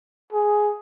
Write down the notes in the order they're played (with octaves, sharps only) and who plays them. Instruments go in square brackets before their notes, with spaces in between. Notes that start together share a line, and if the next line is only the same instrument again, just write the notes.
[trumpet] G#4